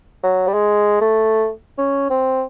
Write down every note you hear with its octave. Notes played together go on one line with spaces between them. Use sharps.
F#3
G3
G#3
A3
C#4
C4